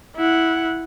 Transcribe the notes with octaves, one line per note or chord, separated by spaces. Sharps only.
E4 F#5